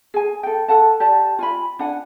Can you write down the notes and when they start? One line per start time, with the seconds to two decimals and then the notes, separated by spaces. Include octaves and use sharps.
0.14 G#4 G#5
0.43 A4 G5
0.68 A4 F#5 A5
1.00 G4 D5 A5
1.39 F4 G#5 B5
1.79 D4 F#5 G#5